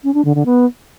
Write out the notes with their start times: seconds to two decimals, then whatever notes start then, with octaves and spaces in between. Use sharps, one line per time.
0.04 C#4
0.14 D4
0.25 D3
0.35 D3
0.45 B3